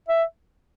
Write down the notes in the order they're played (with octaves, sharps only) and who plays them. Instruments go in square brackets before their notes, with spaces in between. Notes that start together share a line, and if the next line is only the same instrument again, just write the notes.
[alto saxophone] E5